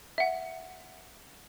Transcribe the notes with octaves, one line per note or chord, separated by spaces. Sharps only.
E5 F#5